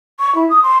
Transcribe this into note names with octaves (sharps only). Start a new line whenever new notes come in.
C#6
E4
D#6
C6